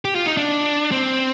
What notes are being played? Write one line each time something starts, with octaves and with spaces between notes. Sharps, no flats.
G4
F4
D#4
D4
C4